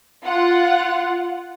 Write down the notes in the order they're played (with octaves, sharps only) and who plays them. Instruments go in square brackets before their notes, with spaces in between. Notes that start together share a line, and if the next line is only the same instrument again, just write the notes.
[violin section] F4 F#5